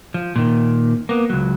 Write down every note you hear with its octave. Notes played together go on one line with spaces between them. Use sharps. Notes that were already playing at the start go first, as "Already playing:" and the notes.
F3
A#2 D#3
A#3 B3
C#2 F#3